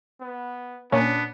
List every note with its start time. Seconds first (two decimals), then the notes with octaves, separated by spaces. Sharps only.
0.21 B3
0.92 A#2 B3 C#4 D4